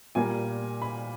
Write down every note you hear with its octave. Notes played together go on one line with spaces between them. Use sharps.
A#2 G3 A#3 G#5
B5